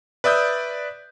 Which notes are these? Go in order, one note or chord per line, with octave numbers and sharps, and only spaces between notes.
B4 D5 E5 D#6 G6